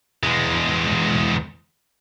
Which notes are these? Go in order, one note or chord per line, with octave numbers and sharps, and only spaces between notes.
E2 G#3